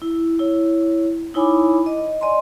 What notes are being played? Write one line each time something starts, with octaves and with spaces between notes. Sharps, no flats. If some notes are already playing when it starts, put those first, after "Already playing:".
E4
E4 C#5
D#4 E4 C#5 G#5 B5 D6
D#5
D5 D#5 G#5 A#5 C6